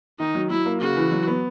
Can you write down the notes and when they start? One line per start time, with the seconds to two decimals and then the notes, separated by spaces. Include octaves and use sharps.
0.20 D#3 D#4
0.35 F#3
0.50 F#3 E4
0.66 A#3
0.82 C#3 F#4
0.96 E3
1.12 F#3
1.28 B3